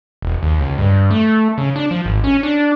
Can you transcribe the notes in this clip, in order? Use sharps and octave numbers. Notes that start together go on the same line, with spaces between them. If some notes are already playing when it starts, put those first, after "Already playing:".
E1
D#2
C#2
G2
A3
C#3
D4
F3
G#1
C#4
D4